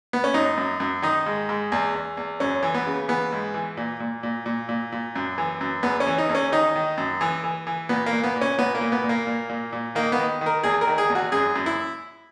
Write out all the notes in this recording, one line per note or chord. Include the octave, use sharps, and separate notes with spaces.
B3
C#4
F#2 D#4
F#2
F#2
D#3 D#4
G#2
G#2
E2
E2
E2
F#2 C#4
E3
B3
C#3
E3 B3
G#2
E3
A#2
A#2
A#2
A#2
A#2
A#2
F#2
E3
F#2
E2 B3
C#4
E3
D#4
E2
C#4
D#3 D#4
D#3
F#2
E3
E3
E3
A#2 B3
A#3
A#2
B3
A#2
C#4
A#2 B3
A#3
A#2
B3
A#2
A#3
A#2
A#2
A#2
D#3 A#3
B3
D#3
D#3
A#4
E2 G#4
A#4
D#3
G#4
E2
F#4
F#2 G#4
F#2
E4